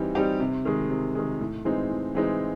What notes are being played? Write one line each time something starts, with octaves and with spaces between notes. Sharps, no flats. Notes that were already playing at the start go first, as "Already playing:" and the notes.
Already playing: E3 G3 C4 D#4 G4
G3 C4 D#4 G4
C3
D#3 G#3
C3
D#3 G#3
A2
E3 G#3 C4 D#4
A2
E3 G#3 C4 D#4